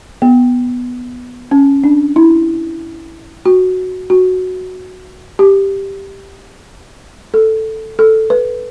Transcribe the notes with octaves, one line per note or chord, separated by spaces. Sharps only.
B3
C#4
D4
E4
F#4
F#4
G4
A4
A4
B4